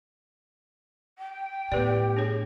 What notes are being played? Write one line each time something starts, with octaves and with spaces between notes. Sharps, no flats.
G5
A2 B3 G4 B4 D5
D4 G#4 C#5